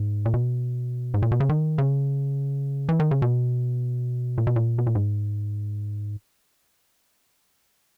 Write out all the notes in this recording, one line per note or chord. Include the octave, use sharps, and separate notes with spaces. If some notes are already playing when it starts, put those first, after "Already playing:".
Already playing: G#2
A#2
B2
G#2
A#2
B2
C#3
D#3
C#3
E3
D#3
C#3
B2
A#2
B2
A#2
B2
A#2
G#2